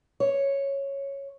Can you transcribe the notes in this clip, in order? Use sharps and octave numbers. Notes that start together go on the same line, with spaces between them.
C#5